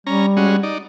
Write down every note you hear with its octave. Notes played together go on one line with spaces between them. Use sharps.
G3 C#4 A#5
G#3 C#4 F#4
D#4 D5